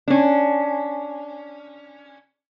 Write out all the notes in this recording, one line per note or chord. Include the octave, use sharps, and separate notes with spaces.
C#4 D4